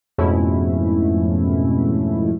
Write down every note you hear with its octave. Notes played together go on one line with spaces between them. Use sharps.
F2 G#2 B2 A3 C#4 E4